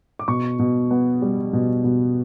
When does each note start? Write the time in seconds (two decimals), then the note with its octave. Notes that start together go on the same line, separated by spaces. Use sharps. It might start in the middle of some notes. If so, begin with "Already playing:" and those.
0.19 D6
0.28 B2 C#6
0.59 B2
0.91 B3
1.22 G3
1.53 B2
1.84 B2